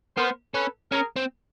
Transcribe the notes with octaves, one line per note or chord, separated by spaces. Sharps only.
B3 A#4 C5
C#4 A4 B4
C#4 G#4 A#4
C4